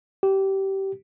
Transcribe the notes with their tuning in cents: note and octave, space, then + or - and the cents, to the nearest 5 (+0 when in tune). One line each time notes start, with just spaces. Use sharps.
G4 -20